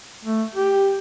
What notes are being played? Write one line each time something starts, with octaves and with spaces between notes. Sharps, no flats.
A3
G4